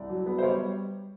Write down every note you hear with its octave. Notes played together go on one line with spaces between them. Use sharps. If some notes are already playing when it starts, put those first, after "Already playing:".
Already playing: C2 D5
F#3
B3
C5
G3 C#5